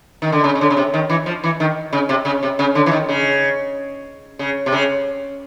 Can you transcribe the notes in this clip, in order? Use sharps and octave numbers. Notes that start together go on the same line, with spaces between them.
D#3
D3
C#3
C#3
D3
C#3
C3
D#3
E3
F3
E3
D#3
C#3
C3
C#3
C3
C#3
D3
E3
D#3
C#3
C#3
C3
C#3